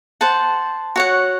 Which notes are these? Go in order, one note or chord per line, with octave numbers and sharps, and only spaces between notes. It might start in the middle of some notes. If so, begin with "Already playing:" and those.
C5 F#5 A5
F#4 C#5 F#5